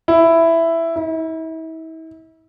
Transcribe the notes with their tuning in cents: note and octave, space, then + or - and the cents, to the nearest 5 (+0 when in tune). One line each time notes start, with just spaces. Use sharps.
E4 +5
E4 -40